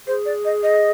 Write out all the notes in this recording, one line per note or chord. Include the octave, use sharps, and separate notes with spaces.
G#4 C5
D5
D#5
D#5